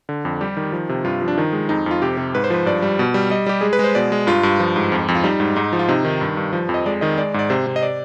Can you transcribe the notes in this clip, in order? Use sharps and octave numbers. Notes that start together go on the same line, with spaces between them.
D3
F2
G3 G4
D#3
F3
C3
G2 F4
F3
D4
D#3 D#4
G#3
F2 D#4
F2 F4
C3 G4
C3
G#2 B4
C5
F3 B4
G2 D5
G3
B2
G3
G3 D#5
G3 G4
G#3 G#4
B4
G#3
C5
B2 D5
G#3
G2 F4
G2
F3
G#2
F2
F2
F4
G3 D#4
G#2
G#2 D#4
F3
F4
C3 D#4
D#3
G2
G2
F3
F2
D#5
G#3 D5
D#3 D#5
G#3 D5
G#2 D5
C3 C5
C3
D#5
D5